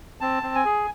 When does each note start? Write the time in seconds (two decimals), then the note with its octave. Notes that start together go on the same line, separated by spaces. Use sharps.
0.21 C4 A5
0.43 C4
0.55 G#5
0.65 G#4